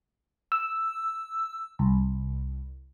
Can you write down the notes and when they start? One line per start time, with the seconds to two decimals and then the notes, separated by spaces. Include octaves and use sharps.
0.52 E6
1.79 C2